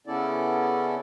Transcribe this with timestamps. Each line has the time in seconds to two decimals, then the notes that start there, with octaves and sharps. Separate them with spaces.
0.07 C#3 B3 C#4 E4 A4 D5